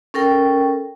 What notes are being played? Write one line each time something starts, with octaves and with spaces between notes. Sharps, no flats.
C#4 A4 A#4 G5